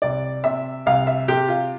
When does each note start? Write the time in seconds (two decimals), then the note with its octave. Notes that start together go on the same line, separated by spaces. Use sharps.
0.02 C2 D5
0.44 C3 E5
0.86 C2 F5
1.07 E5
1.28 C3 G4
1.48 F4